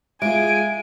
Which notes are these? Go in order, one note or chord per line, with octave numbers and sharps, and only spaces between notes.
G#3 F4 G#4 E5 G#5 D7